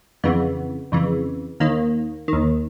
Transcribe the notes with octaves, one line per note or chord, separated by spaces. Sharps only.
F2 C#3 E3 B3
F2 C#3 E3
D#2 D#3 A#3
D#2 D#3